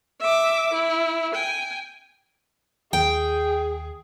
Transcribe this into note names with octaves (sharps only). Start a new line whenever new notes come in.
E5 D6
E4
G5 G#5
D#2 G#4 G5